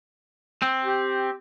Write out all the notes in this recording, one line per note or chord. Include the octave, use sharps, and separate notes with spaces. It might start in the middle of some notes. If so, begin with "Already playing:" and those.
C4
G4